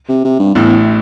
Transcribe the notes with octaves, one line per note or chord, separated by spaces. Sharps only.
C3
C3
G2
A1 E2 A2